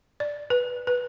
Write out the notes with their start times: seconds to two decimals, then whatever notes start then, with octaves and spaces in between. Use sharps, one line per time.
0.20 D5
0.50 B4
0.87 B4